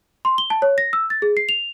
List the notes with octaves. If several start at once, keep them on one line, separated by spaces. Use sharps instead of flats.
C6
G7
A5
C#5
A#6
E6
A6
G#4
C7
F7